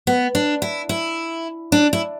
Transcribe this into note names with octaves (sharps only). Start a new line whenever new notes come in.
B3
D4
E4
E4
D4
E4